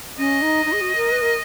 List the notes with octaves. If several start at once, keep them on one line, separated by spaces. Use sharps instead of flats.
C#4 D#5
D#4
D#4
G#4
F#4
A#4
B4
A#4